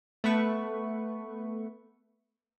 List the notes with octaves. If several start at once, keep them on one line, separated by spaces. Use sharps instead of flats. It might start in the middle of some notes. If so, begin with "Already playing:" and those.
A3 B3 B4 C#6